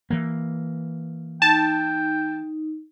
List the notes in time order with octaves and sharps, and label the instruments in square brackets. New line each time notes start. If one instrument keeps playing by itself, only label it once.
[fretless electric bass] E3 A#3
[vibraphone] D#4 [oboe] G5 [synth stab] A5